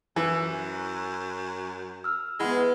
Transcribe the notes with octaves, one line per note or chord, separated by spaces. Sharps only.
F#2 E3
E6 F6
G#3 B3 E4 F#5 B5 F6